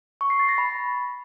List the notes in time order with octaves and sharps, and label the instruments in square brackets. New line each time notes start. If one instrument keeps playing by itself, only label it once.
[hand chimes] C#6
C7
A6
A#6
B5